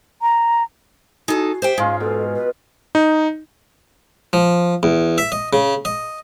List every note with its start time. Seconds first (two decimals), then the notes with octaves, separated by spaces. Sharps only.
0.22 A#5
1.28 D#4 F#4 G#4 A4
1.62 G4 C5 E5 G5
1.78 G#2 C#4 F4 G#4 F5
2.00 B2 A4
2.35 B4
2.95 D#4
4.33 F3
4.83 E2
5.18 E5
5.32 D#5
5.53 C#3
5.85 D#5